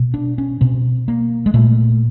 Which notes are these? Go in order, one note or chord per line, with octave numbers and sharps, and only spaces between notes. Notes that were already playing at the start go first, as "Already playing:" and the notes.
Already playing: B2
D4
C#4
B2 C4
A#3
G#3
A#2 A3